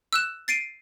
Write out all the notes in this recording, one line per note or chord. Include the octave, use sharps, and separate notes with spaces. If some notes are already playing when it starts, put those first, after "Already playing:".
E6 F#6 E7
A6 C7 D7 D#7